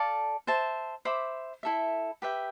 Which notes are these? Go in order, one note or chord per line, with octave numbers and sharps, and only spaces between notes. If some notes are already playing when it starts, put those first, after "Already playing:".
Already playing: A4 D5 F5 A5
C5 E5 A5
C5 E5 B5 D6
E4 A4 E5
G4 B4 E5 G5